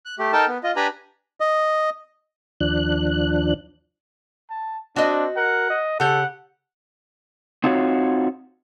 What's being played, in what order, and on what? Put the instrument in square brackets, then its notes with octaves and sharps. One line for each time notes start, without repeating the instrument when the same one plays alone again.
[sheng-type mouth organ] F#6
A3 G4
D#4 A4 A#4 G5 A5
B3
F4 D#5
D4 G4 B4 G#5 A#5 B5
[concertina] D#5
[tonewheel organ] D#2 F3 D4 F#6
[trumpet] A5
[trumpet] C4 [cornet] D4 [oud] F#4 D#5
[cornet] A#4 [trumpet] F#5
[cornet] D#5
[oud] C#3 G4 [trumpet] A4 [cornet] F#5
[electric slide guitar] C4 D#4 F4 F#4 C#5